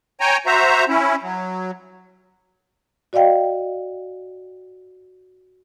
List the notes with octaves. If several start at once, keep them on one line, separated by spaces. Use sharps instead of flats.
C#5 G5 G#5 A#5
F#4 C5 E5 A#5
C#4 E4
F#3
F#4 D5 D#5 F5 G5